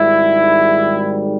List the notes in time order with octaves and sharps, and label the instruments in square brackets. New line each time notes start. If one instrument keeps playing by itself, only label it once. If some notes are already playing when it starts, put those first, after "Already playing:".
Already playing: [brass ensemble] G#1 G#2 D#3 G3 E4